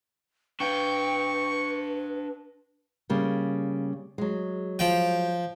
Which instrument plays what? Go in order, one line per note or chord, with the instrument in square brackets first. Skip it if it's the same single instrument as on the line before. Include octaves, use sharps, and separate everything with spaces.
[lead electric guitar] D4 F5 [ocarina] B4 [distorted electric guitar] G5 [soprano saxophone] C#6
[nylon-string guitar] C#3 G3 A#3
F#3 G#3
[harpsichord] F3 G5